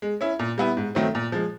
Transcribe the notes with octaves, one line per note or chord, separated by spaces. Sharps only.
G#3
C#4 E4
A#2
G3 B3 E4
G#2
D#3 F#3 A3 C4
A#2
F3 G#3